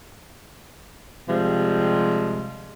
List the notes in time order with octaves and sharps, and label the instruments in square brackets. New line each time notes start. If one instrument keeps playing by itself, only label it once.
[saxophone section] C3 F3 G3 G#3